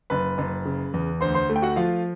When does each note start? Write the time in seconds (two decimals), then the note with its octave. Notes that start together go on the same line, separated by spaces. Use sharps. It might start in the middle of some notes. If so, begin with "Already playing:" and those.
0.10 F#1 B4 B5
0.38 F#1
0.65 C#3
0.94 E2
1.21 D2 C5 C6
1.35 C5 C6
1.50 A3
1.56 G5
1.62 F#4 F#5
1.76 F3 F4 F5